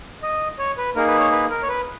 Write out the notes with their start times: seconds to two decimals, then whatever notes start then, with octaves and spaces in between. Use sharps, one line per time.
0.23 D#5
0.59 C#5
0.78 B4
0.96 A#3 D#4 G#4 A#4
1.08 B4
1.19 C#5
1.32 B4
1.50 A#4
1.63 C#5
1.68 B4